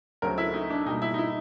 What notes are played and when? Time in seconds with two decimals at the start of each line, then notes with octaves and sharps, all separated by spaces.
0.22 D2 C#3 F#3 A3 C4 A#4
0.38 E4
0.54 D#4
0.70 D4
0.85 B2 G3 A#3 D#4
1.02 E4
1.14 D#4
1.18 E4